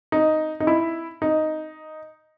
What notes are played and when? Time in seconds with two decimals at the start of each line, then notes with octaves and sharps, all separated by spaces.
0.12 D#4
0.60 D#4
0.67 E4
1.22 D#4